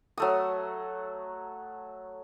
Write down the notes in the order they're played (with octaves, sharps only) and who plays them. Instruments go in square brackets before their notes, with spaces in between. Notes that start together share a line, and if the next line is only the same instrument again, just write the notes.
[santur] F#3 A3 D#6